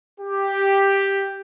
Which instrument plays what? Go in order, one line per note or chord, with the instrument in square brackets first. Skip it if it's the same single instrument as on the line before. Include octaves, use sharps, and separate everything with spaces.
[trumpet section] G4